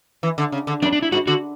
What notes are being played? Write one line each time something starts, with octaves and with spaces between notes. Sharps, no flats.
E3
D3
C#3
D3
F#2 D4
D4
E4
G#2 F#4
D3 F#4